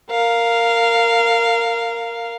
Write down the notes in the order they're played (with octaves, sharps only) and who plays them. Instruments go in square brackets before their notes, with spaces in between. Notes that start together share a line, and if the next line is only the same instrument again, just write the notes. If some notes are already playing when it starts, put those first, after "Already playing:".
[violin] A#4 F5